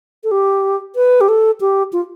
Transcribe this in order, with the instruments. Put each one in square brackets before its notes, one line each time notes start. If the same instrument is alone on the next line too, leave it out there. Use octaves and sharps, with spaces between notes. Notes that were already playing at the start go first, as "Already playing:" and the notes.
[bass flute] A4
G4
B4
G4
A4
G4
F4